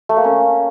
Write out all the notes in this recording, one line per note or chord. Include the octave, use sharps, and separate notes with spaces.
A3
A#3
C#4